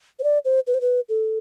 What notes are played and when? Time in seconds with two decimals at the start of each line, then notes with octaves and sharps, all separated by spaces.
0.19 C5
0.23 D5
0.45 C5
0.67 B4
0.74 C5
0.81 B4
1.09 A4